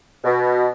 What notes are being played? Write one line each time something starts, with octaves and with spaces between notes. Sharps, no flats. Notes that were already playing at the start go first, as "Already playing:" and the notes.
B2